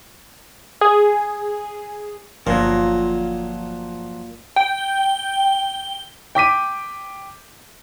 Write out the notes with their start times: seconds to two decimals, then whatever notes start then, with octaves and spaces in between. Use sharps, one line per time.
0.81 G#4
2.47 G1 A#2 F3 F#3
4.56 G5
6.35 G5 D6 B6 D#7